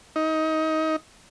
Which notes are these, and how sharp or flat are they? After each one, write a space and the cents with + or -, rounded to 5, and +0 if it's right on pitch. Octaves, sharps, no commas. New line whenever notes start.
D#4 +25